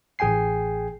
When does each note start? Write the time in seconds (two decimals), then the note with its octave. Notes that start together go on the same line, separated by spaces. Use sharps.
0.19 A1 G#4 G5 G#5 C7